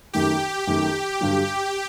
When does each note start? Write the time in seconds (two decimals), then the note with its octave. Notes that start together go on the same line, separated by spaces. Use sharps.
0.13 F#2 D#3 A3 G4
0.67 F#2 D#3 A3
1.21 G2 D3 F#3